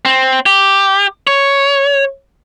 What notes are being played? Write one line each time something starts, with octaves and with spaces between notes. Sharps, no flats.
C4
G4
C#5